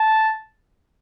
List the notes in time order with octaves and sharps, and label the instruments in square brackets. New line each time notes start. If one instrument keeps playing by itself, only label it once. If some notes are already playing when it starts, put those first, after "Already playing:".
Already playing: [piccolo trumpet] A5